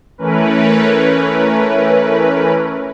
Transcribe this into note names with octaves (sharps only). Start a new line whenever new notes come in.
E3 A3 C#4 A#4 B4